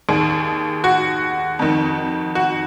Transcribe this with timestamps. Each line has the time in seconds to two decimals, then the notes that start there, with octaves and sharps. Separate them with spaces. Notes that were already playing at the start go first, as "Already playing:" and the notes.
0.09 D#2 D#3 G#4
0.84 F#4
1.59 F2 D#3
2.35 F#4